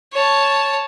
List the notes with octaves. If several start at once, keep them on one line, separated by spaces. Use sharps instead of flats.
C#5 A5